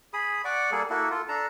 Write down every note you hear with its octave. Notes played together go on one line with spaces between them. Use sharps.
G#4 B5 D#6
D5 F#5 C#6 D6
G3 A#3 G#4 A4
A#3 E4 F#4 A4
F4 A4
D4 A4 A5 A#5